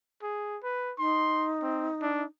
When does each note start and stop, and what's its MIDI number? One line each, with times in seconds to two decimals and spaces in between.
0.23 0.58 68
0.63 0.94 71
0.99 2.24 63
0.99 1.50 84
1.62 1.88 60
2.02 2.24 62